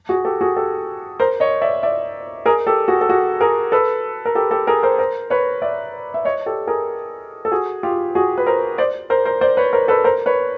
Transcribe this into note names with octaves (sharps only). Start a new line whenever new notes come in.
F#4 G#4
G4 A4
F#4 G#4
G4 A4
A#4 C5
C#5 D#5
D5 E5
D5 E5
G#4 A#4
G4 A4
F#4 G#4
A4
F#4 G#4
G#4 A#4
A4 B4
A#4
G4 A4
G4 A4
G#4 A#4
A#4 C5
A#4 C5
B4 C#5
D5 E5
E5
C#5 D#5
G4 A4
G#4 A#4
A4
F#4 G#4
F4 G4
F#4 G#4
B4
A#4 C5
C5 D5
A#4 C5
A#4 C5
C5 D5
B4 C#5
A#4 C5
A4 B4
A#4 C5
B4 C#5